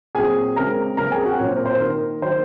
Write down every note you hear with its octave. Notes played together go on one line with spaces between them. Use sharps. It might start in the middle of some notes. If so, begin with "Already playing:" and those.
A#2 F#3 C4 G#4 G#5
C#3 G#3 C4 A#4 A#5
C#3 F#3 C4 A#4 A#5
G#4 G#5
F#4 F#5
A#2 F#3 C4 C#5
C5
A#4
C5
D#3 A#3 A#4
D#3 F#3 A#3 C5